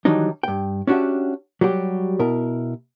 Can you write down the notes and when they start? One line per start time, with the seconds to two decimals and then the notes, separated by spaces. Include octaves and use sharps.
0.05 D#3 E3 F#3 G3 D4 D#4
0.43 G2 G5
0.87 C#4 D4 F#4 G4 E5
1.61 F#3 G3 F#4 G4
2.19 B2 E4 A#4